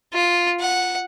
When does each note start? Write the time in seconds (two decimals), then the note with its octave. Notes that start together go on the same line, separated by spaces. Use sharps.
0.13 F4
0.60 F#5